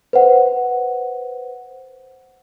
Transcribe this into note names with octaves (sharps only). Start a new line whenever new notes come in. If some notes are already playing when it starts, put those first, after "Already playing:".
B4 C5 F#5